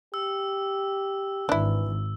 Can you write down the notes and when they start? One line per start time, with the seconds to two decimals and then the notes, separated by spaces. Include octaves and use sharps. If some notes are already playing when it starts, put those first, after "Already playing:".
0.14 G4 E6
1.49 G#1 E3 D4 E4